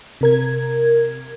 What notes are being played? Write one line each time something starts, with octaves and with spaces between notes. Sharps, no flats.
C3 A#4 G#6